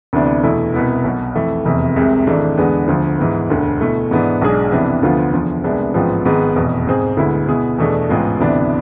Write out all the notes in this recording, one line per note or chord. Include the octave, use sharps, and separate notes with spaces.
D2 C3 E3 B3 D4
E2 B2 A3 E4
C2 B2 B3 E4
B1 B2 B3
F2 E3 A3
F1 E2 C3
C2 C3 G#3
G#1 G#2 E3 A3 D4
E2 D3 G#3 B3 D4
D2 D3 F3
G#2 E3 B3
E1 D2 D3
B2 A3 E4
G#2 E3 B3 D4
B1 B2 G#3 D4 G#4
F2 C3 E3 B3 D4
D2 D3 F3 B3 F4
E2 D3 F3
C2 C3 G#3 B3 D4
A1 G#2 F3 B3 F4
G#1 G#2 G#3 B3
F1 E2 B2
G#2 G#3 C4 G#4
D2 D3 G#3 B3 E4
B2 B3 E4 G#4
E2 B2 A3 D4 G#4
A1 G#2 G#3 B3 F4
D2 C3 E3 B3 D4